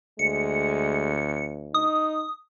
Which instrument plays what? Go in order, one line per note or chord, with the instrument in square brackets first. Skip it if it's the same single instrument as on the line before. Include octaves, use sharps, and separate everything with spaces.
[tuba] D2 [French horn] G#3 [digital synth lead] C#7
[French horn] D#4 [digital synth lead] D#6